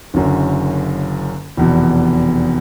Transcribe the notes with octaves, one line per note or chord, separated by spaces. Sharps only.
F#1 F#2 D3
F1 E2 B2